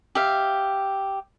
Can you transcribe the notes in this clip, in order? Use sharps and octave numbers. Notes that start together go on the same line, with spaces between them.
G4 E5 F5